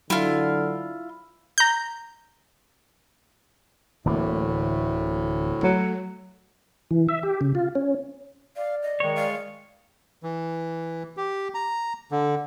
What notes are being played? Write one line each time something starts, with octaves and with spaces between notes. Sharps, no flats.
D3 F#3 E4 F4
A#5 G6
D1 D2 A2 E3 A#3
F#3 A3
E3
E5
G4
C#3
F4
C#4
D5 F5
D#5
D#3 G#3 C#5
F5
E3
G4
A#5
D3